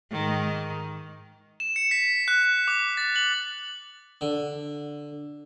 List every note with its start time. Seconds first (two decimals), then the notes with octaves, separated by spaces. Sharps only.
0.11 G#2 D#3
1.60 E7
1.76 C#7
1.91 B6
2.28 F#6
2.68 D6
2.97 A6
3.16 F#7
4.21 D3